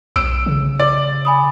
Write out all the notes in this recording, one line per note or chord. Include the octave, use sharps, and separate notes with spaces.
B1 E6 D7
C#3
D5
G#5 B5 D#6